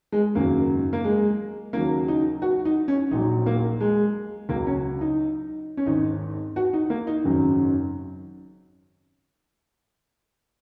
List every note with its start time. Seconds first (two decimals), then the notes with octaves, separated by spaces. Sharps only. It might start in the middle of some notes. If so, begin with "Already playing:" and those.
0.12 G#3
0.35 G#1 F#2 C#3 F#3 A#3
0.93 A#3
1.04 G#3
1.73 D#2 C#3 F#3 A#3
2.08 D#4
2.42 F#4
2.65 D#4
2.88 C#4
3.11 A#1 A#2 F#3 D#4
3.46 A#3
3.81 G#3
4.49 C#2 C#3 F#3 A#3
4.67 C#4
5.01 D#4
5.77 C#4
5.86 G#1 G#2 D#3 D#4
6.56 F#4
6.73 D#4
6.90 A#3
7.07 D#4
7.24 G#1 F#2 C#3 F#3